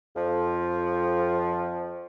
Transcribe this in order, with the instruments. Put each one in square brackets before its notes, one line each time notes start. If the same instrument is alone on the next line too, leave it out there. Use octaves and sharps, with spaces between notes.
[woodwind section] F2 F3